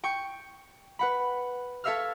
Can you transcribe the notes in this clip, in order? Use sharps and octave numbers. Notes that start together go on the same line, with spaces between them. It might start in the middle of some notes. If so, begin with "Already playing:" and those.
G5 C#6 C#7
B4 F#5 B5
A4 C#5 E5 F5 E6 F6